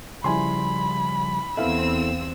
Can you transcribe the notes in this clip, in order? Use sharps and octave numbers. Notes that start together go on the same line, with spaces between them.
C#3 F3 G3 E4 G#5 B5 C6
E2 B3 C4 E4 A4 E5 F5 E6